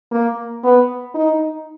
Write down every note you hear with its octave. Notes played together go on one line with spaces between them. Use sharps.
A#3
B3
D#4